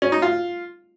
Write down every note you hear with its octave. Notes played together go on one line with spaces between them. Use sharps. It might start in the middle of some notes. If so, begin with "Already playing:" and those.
C#4
D#4
F4